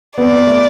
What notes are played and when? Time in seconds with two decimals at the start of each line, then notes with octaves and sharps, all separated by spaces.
0.17 B3 D5
0.32 B3
0.47 A3